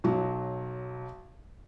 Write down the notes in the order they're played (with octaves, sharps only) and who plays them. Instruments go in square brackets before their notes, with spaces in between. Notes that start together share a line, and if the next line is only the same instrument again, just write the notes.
[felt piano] B1 F#3